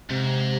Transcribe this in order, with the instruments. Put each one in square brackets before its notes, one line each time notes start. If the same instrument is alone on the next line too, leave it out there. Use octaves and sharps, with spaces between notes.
[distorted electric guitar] G#2 [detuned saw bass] C3